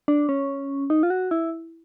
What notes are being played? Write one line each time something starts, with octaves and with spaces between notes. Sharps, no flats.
D4
C#4
D#4
F4
F#4
E4